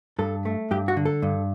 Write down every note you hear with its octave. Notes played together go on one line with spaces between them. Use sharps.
G2 A4
A3
G2 G4
F#4
D3
A4
G2